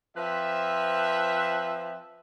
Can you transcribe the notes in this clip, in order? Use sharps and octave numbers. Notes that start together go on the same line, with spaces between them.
F3 C4 B4 E5